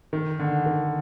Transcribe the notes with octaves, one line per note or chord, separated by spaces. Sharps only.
D#3
D3
D#3